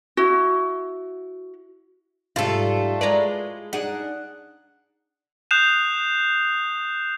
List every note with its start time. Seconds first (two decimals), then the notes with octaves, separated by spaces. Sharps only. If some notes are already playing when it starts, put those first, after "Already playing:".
0.17 E4 F#4
2.36 G#2 C3 G3 A3 F4 A4
3.01 G#3 E4 B4 D5 A#5
3.73 D4 D#4 G#4 F#5
5.51 D#6 F#6 G6 C7 E7 F7